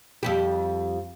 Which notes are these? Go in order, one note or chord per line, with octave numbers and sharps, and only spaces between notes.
F2 G3 G4